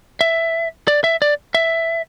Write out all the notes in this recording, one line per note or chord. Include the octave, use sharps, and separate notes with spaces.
E5
D5
E5
D5
E5